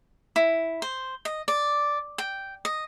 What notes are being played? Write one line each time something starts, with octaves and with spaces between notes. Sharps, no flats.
E4
C5
D#5
D5
G5
D#5